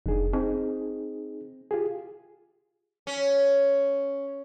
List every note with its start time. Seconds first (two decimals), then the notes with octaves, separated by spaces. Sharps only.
0.06 F1 D4 D#4 G#4
0.33 C4 D#4 G#4
1.71 F4 G4 G#4
3.07 C#4